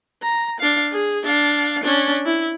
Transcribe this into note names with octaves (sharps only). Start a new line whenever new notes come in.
A#5
D4 F5
G#4
D4 F5
C#4 D4
E4